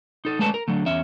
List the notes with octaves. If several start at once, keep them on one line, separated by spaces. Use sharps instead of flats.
D#4 A4
G#3 A3 C#4 A4 B4 A5
A#4
D3 F#3 A3
E2 C#4 E5